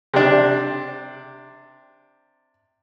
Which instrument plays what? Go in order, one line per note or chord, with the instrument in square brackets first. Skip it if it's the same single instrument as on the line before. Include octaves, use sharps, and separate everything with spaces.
[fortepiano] C3 D4